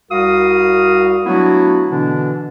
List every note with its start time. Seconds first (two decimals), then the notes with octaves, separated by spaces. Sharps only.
0.12 C2 G3 F#4 A#4 F5 D#6
1.26 F#3 A3 B3 D4 E4 F#4
1.90 B2 D3 E3 B3 D4